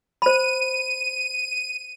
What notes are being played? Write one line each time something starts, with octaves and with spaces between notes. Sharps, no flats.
C5 B5 D#7